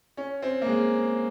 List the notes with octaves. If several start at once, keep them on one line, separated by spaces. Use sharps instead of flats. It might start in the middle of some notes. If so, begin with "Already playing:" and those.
C#4
C4
A#3
G#3